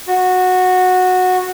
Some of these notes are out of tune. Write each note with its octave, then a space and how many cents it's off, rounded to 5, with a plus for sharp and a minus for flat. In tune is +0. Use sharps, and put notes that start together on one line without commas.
F#4 -10